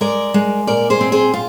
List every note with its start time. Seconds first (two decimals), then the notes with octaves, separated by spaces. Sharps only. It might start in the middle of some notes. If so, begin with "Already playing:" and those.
0.01 G#3 A#4 D5
0.34 G#3
0.67 A#2 A#4 D5
0.90 G#4 C5
1.01 C4
1.12 G#4 C5
1.34 F4